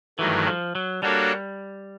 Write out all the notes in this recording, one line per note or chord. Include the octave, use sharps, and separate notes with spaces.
G2 D#3 E3 F#3 A3
F3
F#3
G3 A#3 D4 F#4 A4 C#5